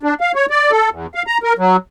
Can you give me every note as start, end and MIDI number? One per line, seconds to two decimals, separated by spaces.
0.03 0.14 62
0.20 0.32 77
0.35 0.46 73
0.50 0.71 74
0.71 0.89 69
0.91 1.06 40
1.15 1.22 77
1.27 1.38 82
1.43 1.53 70
1.58 1.77 54